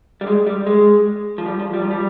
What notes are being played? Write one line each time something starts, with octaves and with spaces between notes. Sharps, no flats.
G3
G#3
G3
G#3
F3
G3
F3
G3
F3
G3